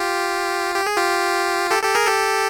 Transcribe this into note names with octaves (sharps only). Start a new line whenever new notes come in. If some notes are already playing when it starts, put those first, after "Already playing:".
Already playing: F4 G4
G4
G#4
F4 G4
G4 A4
G4 A4
G#4 A#4
G4 A4